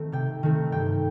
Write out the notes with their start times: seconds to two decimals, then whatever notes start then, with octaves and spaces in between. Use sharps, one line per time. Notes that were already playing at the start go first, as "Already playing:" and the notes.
Already playing: D#3 A3 C4
0.12 C3 G5
0.43 D#3 A3 C4
0.72 G2 G5